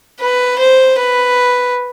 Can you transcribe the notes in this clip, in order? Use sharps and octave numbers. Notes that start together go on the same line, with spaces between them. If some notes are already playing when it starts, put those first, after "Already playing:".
B4
C5
B4